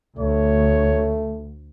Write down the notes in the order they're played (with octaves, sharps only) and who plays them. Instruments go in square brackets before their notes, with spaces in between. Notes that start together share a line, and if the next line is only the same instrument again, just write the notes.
[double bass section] D2 [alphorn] A3 [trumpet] C#5